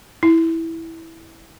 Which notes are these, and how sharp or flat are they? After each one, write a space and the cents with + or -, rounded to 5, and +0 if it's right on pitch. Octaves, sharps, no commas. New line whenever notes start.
E4 -10